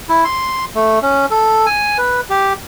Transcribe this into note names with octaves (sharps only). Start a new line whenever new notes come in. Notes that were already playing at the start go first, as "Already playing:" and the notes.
E4
C6
A3
C#4
A4
G#5
B4
G4